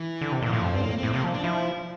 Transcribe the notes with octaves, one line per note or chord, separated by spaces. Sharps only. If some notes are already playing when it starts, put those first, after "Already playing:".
Already playing: E3
D3
C3
A#2 E3
A2 F3
F2
G2 C4
A2 A#3
A2 C4
C3 A#3
F3
D4
F3 E4